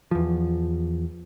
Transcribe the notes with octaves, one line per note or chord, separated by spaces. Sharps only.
E2 F3